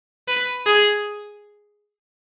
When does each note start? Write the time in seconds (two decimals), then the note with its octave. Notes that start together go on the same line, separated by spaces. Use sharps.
0.28 B4
0.66 G#4